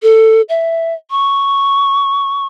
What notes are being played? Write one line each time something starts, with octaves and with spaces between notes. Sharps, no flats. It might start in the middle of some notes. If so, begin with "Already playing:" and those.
A4
E5
C#6